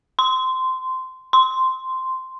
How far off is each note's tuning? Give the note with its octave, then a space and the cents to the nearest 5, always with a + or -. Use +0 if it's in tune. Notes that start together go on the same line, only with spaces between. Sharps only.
C6 -15
C6 -5